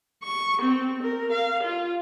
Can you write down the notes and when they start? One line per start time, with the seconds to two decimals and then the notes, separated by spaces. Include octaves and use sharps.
0.23 C#6
0.62 C4
1.03 A#4
1.32 F5
1.63 F4